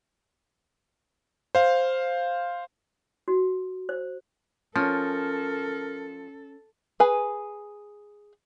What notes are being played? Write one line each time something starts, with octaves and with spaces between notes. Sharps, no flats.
C5 F5
F#4
C5
F3 C#4 A4 A#4
G#4 B4 G#5